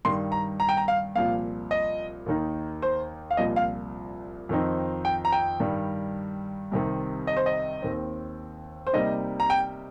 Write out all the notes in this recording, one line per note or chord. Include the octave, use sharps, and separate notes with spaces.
G2 D#3 G3 C6
A#5
A#5
G5
A#5
F5
C2 A#2 F3 F5
D#5
D#2 D#3 A#3 D#4
C5
F5
C2 A#2 F3 D#5
F5
F2 D#3 C4 D#4
G5
A#5
G5
G2 D#3 G3
C2 C3 D#3
D#5
C5
D#5
D#2 D#3 C4
C5
C3 G3 A#3 D#4 D#5
A#5
G5